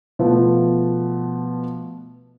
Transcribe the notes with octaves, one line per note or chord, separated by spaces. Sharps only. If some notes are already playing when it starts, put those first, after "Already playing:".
B2 F3 A3 B3